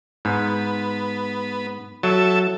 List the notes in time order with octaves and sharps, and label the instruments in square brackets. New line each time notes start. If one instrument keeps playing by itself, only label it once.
[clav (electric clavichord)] G#2 [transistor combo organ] B3
[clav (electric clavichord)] F#3 [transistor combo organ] A4 E5